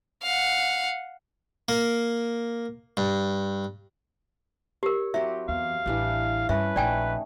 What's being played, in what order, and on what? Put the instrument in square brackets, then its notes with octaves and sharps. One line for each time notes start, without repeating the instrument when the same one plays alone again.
[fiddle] F5 F#5
[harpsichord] A#3
G2
[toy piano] G4 A#4 [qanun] C#5
[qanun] F#3 C4 G4 [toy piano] E5
[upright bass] E2 [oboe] F5
[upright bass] A1 [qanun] E3 G3 D4
[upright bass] G2 [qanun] C#4 A4 [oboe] B4 [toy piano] E5
[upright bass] A#1 [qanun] A3 D#4 [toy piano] D5 G5 G#5